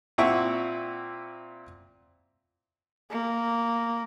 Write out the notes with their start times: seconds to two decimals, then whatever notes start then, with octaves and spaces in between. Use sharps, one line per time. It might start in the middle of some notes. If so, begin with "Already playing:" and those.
0.18 A#2 C4 E4 E5 F#5 C#6
3.11 A#3